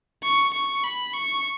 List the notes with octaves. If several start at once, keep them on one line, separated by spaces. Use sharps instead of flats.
C#6
C#6
B5
C#6